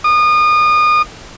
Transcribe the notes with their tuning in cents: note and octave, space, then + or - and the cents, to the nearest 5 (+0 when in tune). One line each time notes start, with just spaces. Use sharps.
D#6 -35